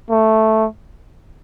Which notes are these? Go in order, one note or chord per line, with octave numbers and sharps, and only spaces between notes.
A3